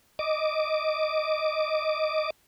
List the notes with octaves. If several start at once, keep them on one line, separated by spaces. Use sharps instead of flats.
D#5 D6